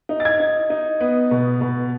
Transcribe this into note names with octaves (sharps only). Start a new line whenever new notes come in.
D#4
A6
G#6
D#4
D#4
B3
B2
B2